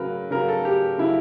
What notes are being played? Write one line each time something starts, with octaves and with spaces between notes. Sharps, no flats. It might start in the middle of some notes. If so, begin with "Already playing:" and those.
Already playing: C#3 F#3 A#4 B4
C#3 F#3 A#4
A4
G4
C#3 F#3 E4